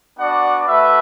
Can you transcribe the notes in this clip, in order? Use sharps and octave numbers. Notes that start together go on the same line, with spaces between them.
B3 D4 F#4 D5 F#5
A3 F#4 B4 E5